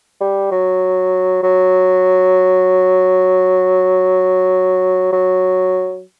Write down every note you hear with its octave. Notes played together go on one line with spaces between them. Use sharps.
G3
F#3
F#3
F#3